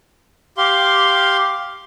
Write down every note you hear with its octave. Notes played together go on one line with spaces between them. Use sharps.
G4 F5 C6